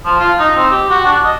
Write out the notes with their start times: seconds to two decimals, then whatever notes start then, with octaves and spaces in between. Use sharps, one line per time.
0.05 F3
0.20 F4
0.39 D#4
0.55 C4
0.71 G4
0.90 F#4
1.05 D4
1.24 D#5